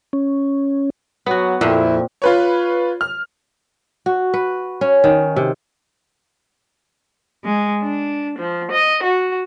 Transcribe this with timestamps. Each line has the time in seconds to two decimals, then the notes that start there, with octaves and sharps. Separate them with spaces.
0.13 C#4
1.26 F#3 B3 F#4
1.61 F2 A#2 E4
2.22 F4 B4 C#5
3.01 F6
4.06 F#4
4.34 B4
4.81 C#4
5.04 D#3
5.36 C3
7.44 G#3
7.81 D4
8.38 F3
8.72 D#5
9.03 F#4